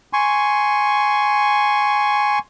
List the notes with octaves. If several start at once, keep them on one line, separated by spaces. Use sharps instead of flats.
G#5 C6 C#6